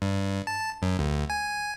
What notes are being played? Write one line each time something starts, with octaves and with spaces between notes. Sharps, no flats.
G2
A5
F#2
D2
G#5